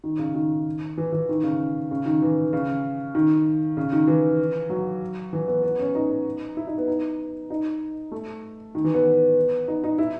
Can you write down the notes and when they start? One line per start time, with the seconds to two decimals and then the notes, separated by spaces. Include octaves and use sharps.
0.04 D#3
0.19 C#3
0.35 D#3
0.98 E3
1.12 E3
1.29 D#3
1.43 C#3
1.91 C#3
2.06 D#3
2.22 E3
2.53 C#3
3.15 D#3
3.77 C#3
3.92 D#3
4.08 E3
4.70 F#3
5.33 E3
5.48 B3
5.63 B3
5.79 C#4
5.95 D#4
6.57 E4
6.67 D#4
6.78 B3
6.88 D#4
7.50 D#4
8.12 A3
8.75 D#3
8.84 E3
8.94 B3
9.68 D#4
9.84 D#4
9.98 E4